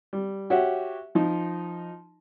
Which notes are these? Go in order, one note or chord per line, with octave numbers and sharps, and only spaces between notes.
G3
F#4 G4 C#5 E5 F#5
F3 D#4